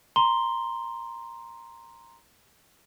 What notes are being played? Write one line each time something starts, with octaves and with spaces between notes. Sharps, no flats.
A#5 C6 G7